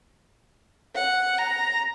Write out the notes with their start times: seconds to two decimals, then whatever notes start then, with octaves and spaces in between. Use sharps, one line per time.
0.95 F#5
1.38 A#5